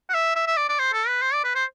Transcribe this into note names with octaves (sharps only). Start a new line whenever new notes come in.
F#5
E5
E5
E5
D5
D5
C5
A4
B4
C5
D5
B4
C5